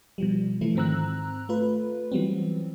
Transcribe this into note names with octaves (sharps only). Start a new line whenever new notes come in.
B2 F3 G3
E3 F3 A3 E4
G#2 D#3 C4 A#5 E6 F#6
A3 F4 B4
E3 F#3 G3 B3 C4